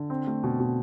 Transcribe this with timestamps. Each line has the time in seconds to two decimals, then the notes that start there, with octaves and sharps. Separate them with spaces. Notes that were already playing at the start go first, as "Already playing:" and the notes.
Already playing: D3
0.10 C4
0.27 A3
0.43 B2
0.60 B2